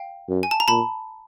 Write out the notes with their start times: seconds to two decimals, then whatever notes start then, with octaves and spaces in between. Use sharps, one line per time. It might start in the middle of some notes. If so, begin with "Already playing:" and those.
Already playing: F5 G5
0.29 F#2
0.43 G#5
0.51 A5
0.60 A#5
0.68 A#2 A5 B5